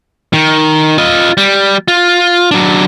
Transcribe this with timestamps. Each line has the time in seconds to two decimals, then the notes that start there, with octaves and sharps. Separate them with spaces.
0.33 D#3
0.98 F4 D#5
1.37 G3
1.88 F4
2.51 F#3 D4